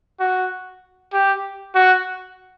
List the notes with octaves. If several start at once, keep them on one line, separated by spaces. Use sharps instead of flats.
F#4
G4
F#4